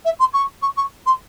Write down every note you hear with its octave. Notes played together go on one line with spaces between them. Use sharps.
E5
C6
C#6
C#6
C#6
C6